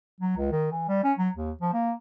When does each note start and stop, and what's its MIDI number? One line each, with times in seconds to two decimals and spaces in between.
0.21 0.34 54
0.37 0.51 37
0.52 0.68 51
0.71 0.84 52
0.88 1.02 55
1.04 1.13 61
1.18 1.29 54
1.36 1.51 39
1.61 1.73 53
1.74 1.92 58